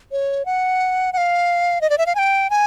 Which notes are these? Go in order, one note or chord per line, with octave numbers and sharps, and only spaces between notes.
C#5
F#5
F#5
F5
D#5
D5
E5
F5
G#5
G5
G#5